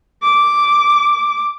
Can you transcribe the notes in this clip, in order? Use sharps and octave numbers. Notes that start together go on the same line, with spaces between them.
D6